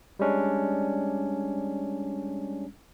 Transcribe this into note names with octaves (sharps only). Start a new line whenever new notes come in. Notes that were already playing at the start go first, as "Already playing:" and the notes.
G3 G#3 C#4 D4